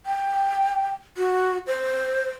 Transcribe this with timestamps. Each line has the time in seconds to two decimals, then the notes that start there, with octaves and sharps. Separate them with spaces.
0.06 G5
1.17 F#4
1.67 C5